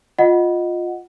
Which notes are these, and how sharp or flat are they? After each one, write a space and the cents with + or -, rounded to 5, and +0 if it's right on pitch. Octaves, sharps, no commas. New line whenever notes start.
F4 +10 D#5 +0 F#5 -5